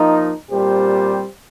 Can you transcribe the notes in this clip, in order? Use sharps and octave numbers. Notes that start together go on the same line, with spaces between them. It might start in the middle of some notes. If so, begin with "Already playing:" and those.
Already playing: F3 A#3 D#4
A#2 G3 C4 G4 C5